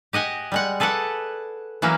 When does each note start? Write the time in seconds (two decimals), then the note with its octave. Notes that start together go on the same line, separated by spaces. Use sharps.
0.13 G4 D#5 F#5 G#5
0.52 G3 G#3 F#5
0.80 G#4 A4 B4 D5 F#5
1.82 E3 F#3 A#3 C#4